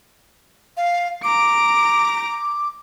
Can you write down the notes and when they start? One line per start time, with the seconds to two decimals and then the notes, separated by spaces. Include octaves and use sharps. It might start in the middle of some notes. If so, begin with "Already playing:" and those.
0.77 F5
1.24 A#5 D6 D7